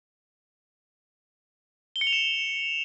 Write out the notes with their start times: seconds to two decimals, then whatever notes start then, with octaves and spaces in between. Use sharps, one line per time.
1.96 G7
2.01 C#7
2.07 F7
2.13 E7